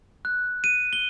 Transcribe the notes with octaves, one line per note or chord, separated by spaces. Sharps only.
F#6
D#7
G7